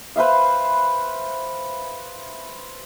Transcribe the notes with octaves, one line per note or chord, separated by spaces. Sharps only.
B4 C5 E5 F5